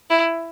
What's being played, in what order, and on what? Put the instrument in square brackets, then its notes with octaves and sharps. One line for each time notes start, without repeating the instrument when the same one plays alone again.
[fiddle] E4